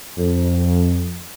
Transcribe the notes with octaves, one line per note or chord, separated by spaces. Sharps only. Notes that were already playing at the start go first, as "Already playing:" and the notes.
F2